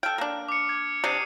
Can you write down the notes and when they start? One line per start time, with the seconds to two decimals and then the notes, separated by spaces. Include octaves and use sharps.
0.03 A4 G5 F6
0.18 A#3 D4
0.48 D6 C#7
0.69 G#6
1.04 C3 D4 D#6 C7 D#7